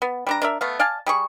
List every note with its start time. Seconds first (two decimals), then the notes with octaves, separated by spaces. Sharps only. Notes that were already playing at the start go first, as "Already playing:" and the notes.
0.02 B3
0.27 G3 D4 A#5
0.42 D4 A#4 E5
0.61 A3 B3 F5
0.79 D5 F5 G#5 A5
1.06 G3 G#4 C#6